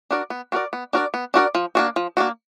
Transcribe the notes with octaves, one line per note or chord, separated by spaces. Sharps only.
D4 F#4 A#4 D5
B3
D4 F#4 A#4 D5
B3
D4 F#4 A#4 D5
B3
D4 F#4 A#4 D5
F3
A#3 D4 F#4
F3
A#3 D4 F#4